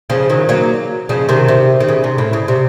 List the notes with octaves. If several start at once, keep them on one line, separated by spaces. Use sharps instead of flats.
C#3 F3
D#3 F#3
F#3 A#3
C#3 F3
C3 D#3
C3
D#3
C#3
C3
A2
C#3
C3